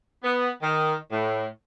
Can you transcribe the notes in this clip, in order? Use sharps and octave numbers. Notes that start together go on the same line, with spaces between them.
B3
D#3
A2